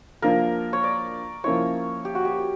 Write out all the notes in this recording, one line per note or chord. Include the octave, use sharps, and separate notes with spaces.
F3 A#3 D4 F4 A#4
C#5
D5
F3 A#3 C#4 E4 C#5
G4
F#4
G4